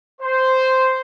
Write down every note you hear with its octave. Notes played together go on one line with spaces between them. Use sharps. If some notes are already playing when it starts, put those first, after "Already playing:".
C5